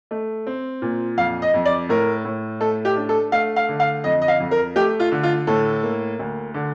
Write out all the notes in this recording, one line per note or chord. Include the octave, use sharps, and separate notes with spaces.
A3
C4
A#2
F2 F5
D#5
F2
D5
A2 A#4
A2
A3 A4
G4
D4
A4
A3 F5
F5
D3
F5
F2 D#5
D#5
F5
F2
A#4
A3 G4
F4
D3
F4
A2 A4
A#3
D2
D3